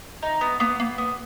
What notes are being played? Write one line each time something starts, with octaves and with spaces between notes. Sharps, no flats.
D#4
B3
A#3 B3
A#3
B3